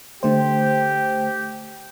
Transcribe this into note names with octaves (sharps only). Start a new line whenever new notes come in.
D3 A3 G4 C5